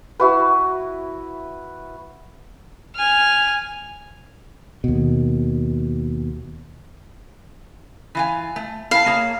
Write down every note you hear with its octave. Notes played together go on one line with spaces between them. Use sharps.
E4 F#4 B4
G#5 F6
D#2 B2
E3 F4 G#5
A3
E4 F5 A5
A#3 G#4 C#5